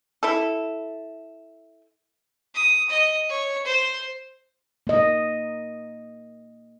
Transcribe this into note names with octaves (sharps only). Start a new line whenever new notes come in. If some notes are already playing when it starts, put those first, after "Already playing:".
E4 A4
D#6
D#5
C#5
C5
A#3 D#5